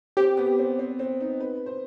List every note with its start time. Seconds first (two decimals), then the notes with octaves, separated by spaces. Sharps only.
0.17 C4 G4
0.37 B3
0.59 C4
0.79 C4
0.99 C4
1.20 D#4
1.40 B4
1.66 C5